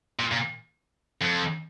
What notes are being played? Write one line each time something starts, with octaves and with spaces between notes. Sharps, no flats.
A#2
A#2
F2